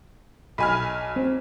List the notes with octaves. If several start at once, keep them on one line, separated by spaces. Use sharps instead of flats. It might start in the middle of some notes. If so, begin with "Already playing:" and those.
B1 G#5 B5 F6
C4